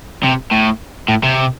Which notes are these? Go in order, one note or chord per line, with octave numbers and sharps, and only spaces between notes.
C3
A2
A2
C3